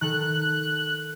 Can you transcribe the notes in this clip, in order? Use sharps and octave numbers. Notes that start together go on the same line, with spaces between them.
D#3 A4 F#6